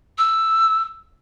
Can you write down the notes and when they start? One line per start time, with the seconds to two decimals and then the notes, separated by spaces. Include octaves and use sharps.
0.18 E6